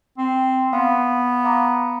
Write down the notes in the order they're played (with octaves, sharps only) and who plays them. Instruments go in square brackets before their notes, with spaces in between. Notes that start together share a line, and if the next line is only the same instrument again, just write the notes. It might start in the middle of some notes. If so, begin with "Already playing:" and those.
[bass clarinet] C4
[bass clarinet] B3 [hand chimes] F5 C6
[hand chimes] F5 A#5 D6